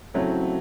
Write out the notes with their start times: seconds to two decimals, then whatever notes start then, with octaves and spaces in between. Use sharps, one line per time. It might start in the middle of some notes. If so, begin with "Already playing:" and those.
0.14 C#3 F#3 A3 C4 E4